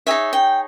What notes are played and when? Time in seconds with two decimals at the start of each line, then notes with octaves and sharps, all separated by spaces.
0.07 D#4 G#4 C#5 E5
0.33 G5